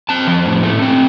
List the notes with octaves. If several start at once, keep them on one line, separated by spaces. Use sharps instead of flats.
C4 A5
F3
A2
A3
C4